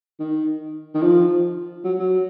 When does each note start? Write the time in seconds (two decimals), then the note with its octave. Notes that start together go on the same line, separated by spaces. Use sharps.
0.19 D#3
0.94 D#3
1.02 F3
1.84 F#3
1.99 F#3